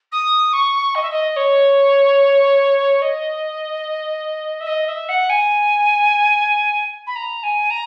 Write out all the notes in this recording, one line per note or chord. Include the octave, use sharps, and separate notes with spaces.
D#6
C#6
D#5
E5
D#5
C#5
D#5
E5
D#5
E5
F#5
G#5
B5
A#5
G#5
A#5